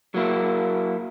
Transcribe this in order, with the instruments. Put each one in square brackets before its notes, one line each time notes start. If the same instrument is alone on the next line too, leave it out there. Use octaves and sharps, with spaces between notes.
[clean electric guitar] F#3 A#3 E4